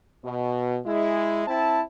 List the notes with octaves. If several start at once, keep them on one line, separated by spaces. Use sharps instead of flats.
B2
G#3 E4
C4 E4 A5